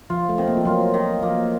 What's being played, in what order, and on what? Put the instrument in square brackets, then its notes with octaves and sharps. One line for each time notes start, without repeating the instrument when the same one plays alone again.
[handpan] F3 [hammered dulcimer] F4
[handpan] A3
[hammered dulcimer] D#3 [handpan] C4
[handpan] A#3
F3
[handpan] F#3 [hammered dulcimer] F4
[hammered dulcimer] D#3
[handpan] F3 [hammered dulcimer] A#3